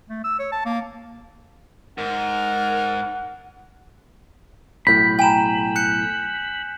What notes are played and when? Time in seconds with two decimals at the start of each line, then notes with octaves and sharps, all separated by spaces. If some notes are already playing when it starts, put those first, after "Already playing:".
0.09 A3
0.24 E6
0.39 C#5
0.52 A5
0.65 A#3
1.98 G#2 A#4 F#5
4.87 B1 A2 B5 G6
5.19 G5 G#5 A#5 E7
5.76 F#6 G6 C#7